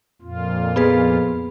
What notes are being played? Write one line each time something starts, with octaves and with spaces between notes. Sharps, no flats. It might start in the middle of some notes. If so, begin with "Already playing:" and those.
F2 A#2 F4
B3 G#4 B4